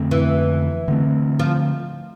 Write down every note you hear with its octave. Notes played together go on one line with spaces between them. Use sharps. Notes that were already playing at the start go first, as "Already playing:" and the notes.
Already playing: F2 D3 A3 C4
E3
D3 A3 C4
F3